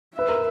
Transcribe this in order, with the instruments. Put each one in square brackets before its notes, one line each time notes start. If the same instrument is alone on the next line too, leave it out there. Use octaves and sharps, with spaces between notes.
[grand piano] B4 [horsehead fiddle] E5
[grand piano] A#4